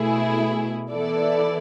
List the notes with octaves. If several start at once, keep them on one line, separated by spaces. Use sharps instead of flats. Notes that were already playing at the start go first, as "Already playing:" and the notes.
Already playing: B2 A3 E4 G#4
E3 B3 E4 A4 D5